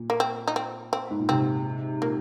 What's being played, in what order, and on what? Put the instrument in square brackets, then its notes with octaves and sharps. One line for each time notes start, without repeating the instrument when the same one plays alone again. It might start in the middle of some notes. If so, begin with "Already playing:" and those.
Already playing: [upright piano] A#2
[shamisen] A#3
C4
D#4
C4
C4
[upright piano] G#2
A#2
[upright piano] G#2 C3 [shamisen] C4
[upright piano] A#2 [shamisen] A#3